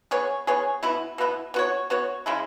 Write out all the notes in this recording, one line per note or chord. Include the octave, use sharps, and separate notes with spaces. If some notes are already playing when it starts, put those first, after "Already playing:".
B3 G#4 C#5
B3 G#4 C#5
B2 B3 E4
B2 B3 E4
B3 F#4 C#5
B3 F#4 C#5
C#3 G#3 E4